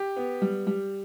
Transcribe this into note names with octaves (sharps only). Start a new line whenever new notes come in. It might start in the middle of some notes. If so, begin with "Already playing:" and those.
Already playing: G4
B3
G3
G3